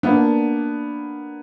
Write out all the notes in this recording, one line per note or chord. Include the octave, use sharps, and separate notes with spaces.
A#3 B3 D4